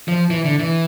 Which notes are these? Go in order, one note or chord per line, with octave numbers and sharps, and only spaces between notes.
F3
E3
D3
E3